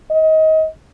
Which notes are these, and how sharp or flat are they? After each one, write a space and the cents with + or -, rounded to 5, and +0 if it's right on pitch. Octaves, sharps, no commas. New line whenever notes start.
D#5 +25